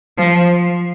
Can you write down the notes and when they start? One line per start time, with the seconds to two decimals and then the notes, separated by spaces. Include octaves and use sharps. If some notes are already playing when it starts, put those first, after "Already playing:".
0.18 F3